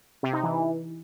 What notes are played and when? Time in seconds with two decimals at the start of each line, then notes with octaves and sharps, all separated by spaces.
0.23 C3
0.33 D#4
0.43 E3